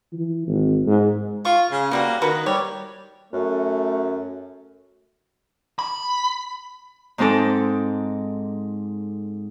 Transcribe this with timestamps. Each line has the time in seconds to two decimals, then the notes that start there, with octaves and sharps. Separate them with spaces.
0.13 E3
0.47 G#1
0.86 G#2
1.45 F4 C#6
1.71 C#3
1.91 B2 G3 A#3 F#4
2.22 D#3 F#4 A#4 B4
2.46 G3 C#5
3.33 F#2 A3
5.79 B5
7.18 G#2 G#3 C4 D#4 A4 D6